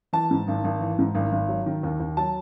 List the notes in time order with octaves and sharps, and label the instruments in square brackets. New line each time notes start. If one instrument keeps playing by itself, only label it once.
[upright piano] E3 A5
G#2
G#1
G#1
E3
G#2
G#1
G#1
F#3
D#3
D#2
D#2
F#3 A5